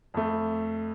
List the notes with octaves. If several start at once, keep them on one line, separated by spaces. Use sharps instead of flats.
F2 A3